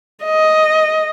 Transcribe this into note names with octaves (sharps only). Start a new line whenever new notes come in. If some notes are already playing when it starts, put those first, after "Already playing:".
D#5